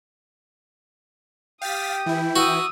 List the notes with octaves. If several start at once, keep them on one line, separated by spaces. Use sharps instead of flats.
G4 F5 G5 D#6 A6 B6
E3 E4
F#4 D#6 E6